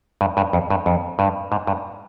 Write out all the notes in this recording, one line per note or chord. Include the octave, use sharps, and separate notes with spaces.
G2
G2
F2
G2
F2
G2
G#2
G2